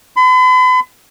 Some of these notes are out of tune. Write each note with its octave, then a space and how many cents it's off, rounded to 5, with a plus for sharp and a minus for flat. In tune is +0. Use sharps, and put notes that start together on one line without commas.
B5 +45